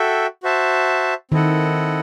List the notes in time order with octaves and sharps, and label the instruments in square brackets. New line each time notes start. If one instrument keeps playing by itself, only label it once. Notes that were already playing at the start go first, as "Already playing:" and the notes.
Already playing: [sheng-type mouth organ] F#4 A4 E5 G5
F#4 C5 E5 A5
[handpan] D#3 [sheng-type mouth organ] C4 E4 A4 D#5 F#5